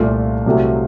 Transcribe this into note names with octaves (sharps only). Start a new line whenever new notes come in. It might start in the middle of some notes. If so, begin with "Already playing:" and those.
Already playing: C2 A#2 A3 F4
C2 C3 F#3 A3